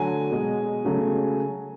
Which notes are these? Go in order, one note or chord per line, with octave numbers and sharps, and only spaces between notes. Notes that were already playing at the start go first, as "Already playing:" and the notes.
Already playing: D3 F#3 A3 G#5
B2 G#3
C#3 F#3 A3